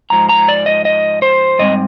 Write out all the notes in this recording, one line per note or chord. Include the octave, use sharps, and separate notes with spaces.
G#2 F3 G#3 A#5
A#5
D5
D#5
D#5
C5
G#2 G3 C4 D#5